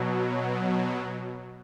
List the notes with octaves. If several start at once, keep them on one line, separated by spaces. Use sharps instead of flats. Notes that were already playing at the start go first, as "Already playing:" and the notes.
Already playing: B2 F#3